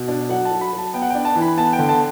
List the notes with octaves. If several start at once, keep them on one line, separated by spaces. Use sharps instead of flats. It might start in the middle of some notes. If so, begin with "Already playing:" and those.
Already playing: B2
D4 D5
F#3 F#5
A5
F#3
B5
F#3
A5
B3 G5
F#5
D4 G5
A5
E3
B5
B3 A5
G5
D3
A5